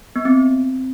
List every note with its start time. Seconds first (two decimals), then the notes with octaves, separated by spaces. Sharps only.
0.16 B3
0.25 C4